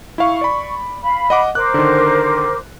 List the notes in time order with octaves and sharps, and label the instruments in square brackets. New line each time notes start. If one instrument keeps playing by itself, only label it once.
[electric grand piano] E4 F5 [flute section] C#6
[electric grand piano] D5 B5
[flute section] F5 B5
[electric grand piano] D#5 F#5 D6
[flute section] A#4 C5 D6 [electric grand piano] F#6
[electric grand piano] D3 D#3